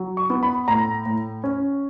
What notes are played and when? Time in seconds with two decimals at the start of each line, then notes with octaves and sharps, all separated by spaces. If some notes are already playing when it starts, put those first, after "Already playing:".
Already playing: F#3
0.17 C#6
0.30 B3
0.43 B5
0.68 A2 A#5
1.06 A2
1.44 C#4